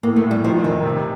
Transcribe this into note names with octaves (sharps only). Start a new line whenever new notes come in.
A2 A#3
A3
A2
G3
D#3 F3
F1 D#3
C3